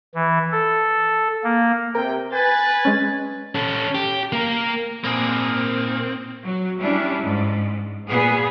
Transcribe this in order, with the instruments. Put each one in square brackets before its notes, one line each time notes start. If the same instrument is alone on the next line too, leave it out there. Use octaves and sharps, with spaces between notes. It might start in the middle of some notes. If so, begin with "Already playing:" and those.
[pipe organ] E3
A4
A#3
[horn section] C3 G5 [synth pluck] A#4
[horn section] B4 [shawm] G#5 [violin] A6
[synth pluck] G#3 C#4
[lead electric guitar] C#4 A4
G4
A#3 A#4
[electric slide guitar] A#2 [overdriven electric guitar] A#3 G#4 [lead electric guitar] C4
[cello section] F#3
G3 C#4 D4 E4
G#2
A#2 B3 G#4